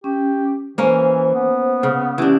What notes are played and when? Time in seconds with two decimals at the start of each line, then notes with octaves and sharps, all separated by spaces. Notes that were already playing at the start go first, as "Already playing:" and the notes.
0.04 C#4 G4
0.78 E3 A#3 C#4 C5
1.35 B3
1.83 C#3
2.18 E3 C#4 D4 G4